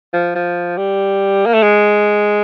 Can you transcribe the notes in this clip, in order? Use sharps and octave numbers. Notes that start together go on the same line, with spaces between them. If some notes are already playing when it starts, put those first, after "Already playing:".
F3
F3
G3
A#3
A3
G#3